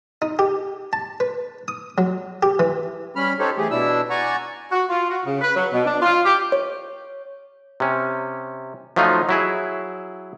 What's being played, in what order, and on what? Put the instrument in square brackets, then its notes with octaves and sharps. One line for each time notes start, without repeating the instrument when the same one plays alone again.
[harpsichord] D#4
G4
A5
B4
D#6
F#3
G4
E3
[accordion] G3 C#4 B5 F6
D#4 G4 A4 C5 C#5
E3 A3 G4 G#4
B2 D4 E4 E6
D5 F#5 G#5 A#5 C#6
[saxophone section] F#4
F4
F#4
C#3
B4
F#3
B2
D4
F4
G4
[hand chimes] C#5
[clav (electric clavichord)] C3 C#4
F3 F#3 A3 D#4 F4
F#3 E4 G#4